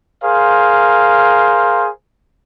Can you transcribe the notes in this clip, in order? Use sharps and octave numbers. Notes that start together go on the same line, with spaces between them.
G#4 A#4 C5 F5